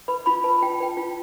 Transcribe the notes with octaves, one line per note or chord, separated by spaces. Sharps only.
B4 B5
F4 B5
B4 A5
F4 G5
A5
B4 G5
F4